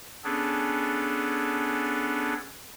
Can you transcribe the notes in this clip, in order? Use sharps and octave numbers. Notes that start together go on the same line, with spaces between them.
B3 C#4 D4 G#4 A4